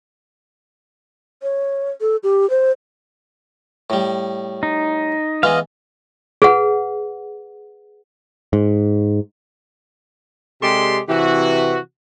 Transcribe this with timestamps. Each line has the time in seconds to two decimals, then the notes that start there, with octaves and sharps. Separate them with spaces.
1.43 C#5
2.01 A4
2.23 G4
2.50 C5
3.90 A2 G3
4.63 D#4
5.43 E3 G#3 B3 D#5 F5
6.42 G#4 B4 F#5
8.53 G#2
10.62 C3 G#3 G4 A4 D5 C6
11.09 C3 E3 F#4